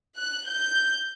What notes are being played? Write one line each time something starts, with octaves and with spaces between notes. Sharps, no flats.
F#6
G6